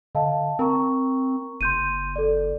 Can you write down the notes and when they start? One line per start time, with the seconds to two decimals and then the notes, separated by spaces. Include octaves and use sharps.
0.15 D3 D#5 F5 A5
0.59 C4 A#4 A#5 C#6
1.61 F#1 C6 G6 D#7
2.16 A4 D5